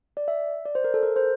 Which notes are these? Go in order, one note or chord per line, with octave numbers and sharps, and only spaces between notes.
D5
E5
D5
C5
A#4
A4
A#4
C5